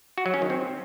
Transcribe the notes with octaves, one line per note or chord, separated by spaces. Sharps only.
F#4
F#3
C#4
D#3
C4